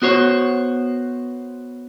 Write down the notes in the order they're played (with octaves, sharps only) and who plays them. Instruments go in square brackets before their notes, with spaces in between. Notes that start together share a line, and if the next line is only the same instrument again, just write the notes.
[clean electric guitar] B3 F#4 C5 C#5